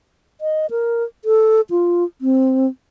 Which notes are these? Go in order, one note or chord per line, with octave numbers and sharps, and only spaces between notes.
D#5
A#4
A4
F4
C4